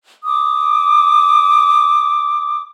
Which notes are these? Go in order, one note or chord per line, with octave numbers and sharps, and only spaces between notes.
D6 D#6